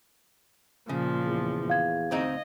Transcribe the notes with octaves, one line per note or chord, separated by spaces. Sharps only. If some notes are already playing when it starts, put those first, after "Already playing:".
A#2 C#3 F3
E2
F5 G#6
D2 C4 D#4 D#5